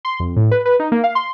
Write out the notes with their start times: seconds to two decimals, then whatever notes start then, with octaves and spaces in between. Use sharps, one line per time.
0.05 C6
0.20 F2
0.36 A2
0.51 B4
0.66 B4
0.80 D#4
0.92 A#3
1.04 F5
1.15 C6